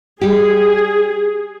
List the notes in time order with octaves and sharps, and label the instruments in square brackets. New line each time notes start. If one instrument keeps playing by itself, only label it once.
[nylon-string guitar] G3 G4 [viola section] G#4